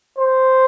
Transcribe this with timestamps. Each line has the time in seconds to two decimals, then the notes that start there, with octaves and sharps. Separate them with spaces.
0.18 C5